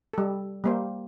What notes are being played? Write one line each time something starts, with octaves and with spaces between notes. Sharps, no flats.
G3 A4
G3 A#3 C5